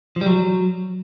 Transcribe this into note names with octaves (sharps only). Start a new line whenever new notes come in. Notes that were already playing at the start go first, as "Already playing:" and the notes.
F3
G3
F#3